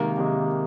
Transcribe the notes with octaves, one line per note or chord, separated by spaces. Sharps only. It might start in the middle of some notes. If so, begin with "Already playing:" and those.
Already playing: C3 D#3 G#3 A#3
C3 D#3 G#3